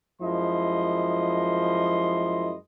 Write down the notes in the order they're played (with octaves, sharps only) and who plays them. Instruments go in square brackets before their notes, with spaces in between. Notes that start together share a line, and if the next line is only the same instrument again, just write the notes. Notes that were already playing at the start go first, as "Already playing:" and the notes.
[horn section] F#2 F3 G#3 E4 D#5 C6